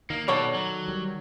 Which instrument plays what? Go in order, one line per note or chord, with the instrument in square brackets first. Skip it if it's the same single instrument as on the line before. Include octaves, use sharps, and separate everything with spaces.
[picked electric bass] D#3 [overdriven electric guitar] A#3
[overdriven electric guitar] B2 [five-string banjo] A4 C#5 D5
[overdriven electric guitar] F#3
[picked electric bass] D#3 G3